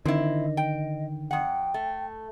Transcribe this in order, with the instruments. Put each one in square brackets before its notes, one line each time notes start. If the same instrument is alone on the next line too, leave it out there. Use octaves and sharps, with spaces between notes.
[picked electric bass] D3 D#3 [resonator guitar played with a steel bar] C4 E4 [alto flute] D#5
[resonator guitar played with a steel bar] G5
[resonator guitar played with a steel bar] F2 F#5 [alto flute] G5
[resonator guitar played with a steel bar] A3